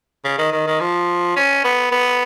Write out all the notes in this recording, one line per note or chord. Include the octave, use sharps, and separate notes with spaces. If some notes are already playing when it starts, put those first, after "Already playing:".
C#3
D#3
D#3
D#3
F3
C#4
B3
B3